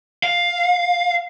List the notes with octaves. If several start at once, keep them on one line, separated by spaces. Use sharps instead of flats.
F5